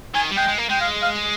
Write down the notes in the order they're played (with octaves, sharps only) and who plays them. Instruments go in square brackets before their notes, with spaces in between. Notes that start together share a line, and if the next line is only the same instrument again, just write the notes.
[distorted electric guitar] D#3 [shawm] G#5
[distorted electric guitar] G3
[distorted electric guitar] G#3 [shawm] G5
[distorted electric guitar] G#3
A#3
[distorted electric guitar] G#3 [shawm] G5
[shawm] F5
F5